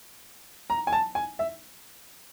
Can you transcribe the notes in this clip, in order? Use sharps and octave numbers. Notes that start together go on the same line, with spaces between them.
A#5
G#5
A5
G#5
E5